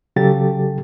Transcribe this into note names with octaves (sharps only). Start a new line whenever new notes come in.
C#3 F#3 G4 A4 A6